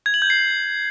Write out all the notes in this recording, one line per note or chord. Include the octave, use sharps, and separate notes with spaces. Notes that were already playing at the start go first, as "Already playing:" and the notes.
G#6
F#7
G6
C7